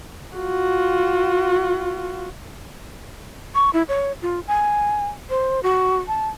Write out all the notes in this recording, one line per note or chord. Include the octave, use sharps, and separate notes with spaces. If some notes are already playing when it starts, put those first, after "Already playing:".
F4 F#4
C#6
E4
C#5
F4
G#5
C5
F#4
A5